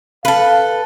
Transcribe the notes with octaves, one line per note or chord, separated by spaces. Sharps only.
A4 B4 F5